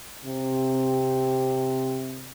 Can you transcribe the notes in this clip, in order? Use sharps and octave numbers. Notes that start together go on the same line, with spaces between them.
C3